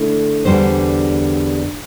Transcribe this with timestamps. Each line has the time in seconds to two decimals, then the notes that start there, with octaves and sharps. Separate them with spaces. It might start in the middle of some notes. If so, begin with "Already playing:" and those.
Already playing: D3 A3 E4
0.45 E2 D3 G3 D4 C5